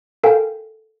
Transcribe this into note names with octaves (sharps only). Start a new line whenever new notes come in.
A4 A#4 F5 G5 G#5